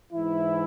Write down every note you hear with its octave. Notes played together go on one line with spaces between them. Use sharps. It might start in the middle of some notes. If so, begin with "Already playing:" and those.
G#2 E3 E4